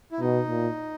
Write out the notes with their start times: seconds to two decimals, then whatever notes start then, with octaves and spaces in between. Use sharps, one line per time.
0.12 E4
0.21 B2 D#4
0.48 A#2